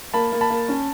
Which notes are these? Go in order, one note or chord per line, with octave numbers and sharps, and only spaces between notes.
A#3 A5 B5
A#3
A5 B5
A#3
C#4